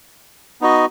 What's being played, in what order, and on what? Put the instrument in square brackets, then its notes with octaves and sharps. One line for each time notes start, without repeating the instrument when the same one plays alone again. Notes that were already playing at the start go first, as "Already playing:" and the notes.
[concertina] B3 D#4 F#4 D#5